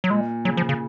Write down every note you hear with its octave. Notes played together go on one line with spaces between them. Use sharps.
F#3
A#2 G#3
C#3 F#3
F3
C#3